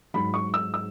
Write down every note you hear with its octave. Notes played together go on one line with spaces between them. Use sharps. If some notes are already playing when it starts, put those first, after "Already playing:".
G#2 F#3 B5
C#6
E6
E6